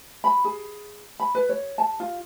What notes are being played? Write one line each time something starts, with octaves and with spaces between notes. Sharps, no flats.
B5
G#4
B5
B4
C#5
A5
F4